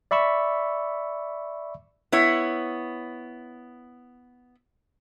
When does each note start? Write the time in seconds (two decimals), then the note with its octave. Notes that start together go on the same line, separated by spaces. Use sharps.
0.11 D5 E5 B5 C#6 E6
2.12 B3 E4 C#5